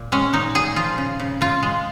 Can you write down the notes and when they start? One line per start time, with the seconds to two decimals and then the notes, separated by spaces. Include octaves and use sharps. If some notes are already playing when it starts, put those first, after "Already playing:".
Already playing: A#2
0.12 G#3 C#4
0.33 A#2 D#4
0.55 A#2 G#4
0.76 F3 F4
0.98 C#3
1.19 C#3
1.41 C#3 F4
1.63 G#3